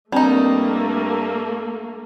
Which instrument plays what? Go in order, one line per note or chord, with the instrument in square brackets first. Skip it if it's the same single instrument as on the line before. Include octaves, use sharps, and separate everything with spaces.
[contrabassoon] G2 [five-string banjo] G3 D#4 [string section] A3 A#3 [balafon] C4